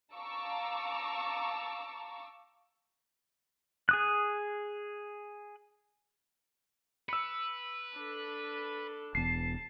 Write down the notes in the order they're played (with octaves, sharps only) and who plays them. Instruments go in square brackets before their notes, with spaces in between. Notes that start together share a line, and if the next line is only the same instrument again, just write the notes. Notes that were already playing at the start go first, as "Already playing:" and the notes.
[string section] F5 A5 A#5 C#6 D6 E6
[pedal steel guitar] G#4 D#6 F#6
[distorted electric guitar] B4 [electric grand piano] E6 C#7
[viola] D4 A4
[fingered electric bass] E1 E2 [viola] A5 [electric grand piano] C7